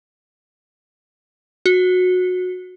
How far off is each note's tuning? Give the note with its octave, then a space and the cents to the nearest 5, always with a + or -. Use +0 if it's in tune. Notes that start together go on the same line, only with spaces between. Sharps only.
F#4 -20